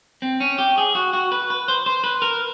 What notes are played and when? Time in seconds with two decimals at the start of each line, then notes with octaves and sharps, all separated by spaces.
0.22 C4
0.40 C#4
0.58 G4
0.78 G#4
0.95 F#4
1.13 F#4
1.32 B4
1.50 B4
1.68 C5
1.86 C5
2.04 B4
2.22 A#4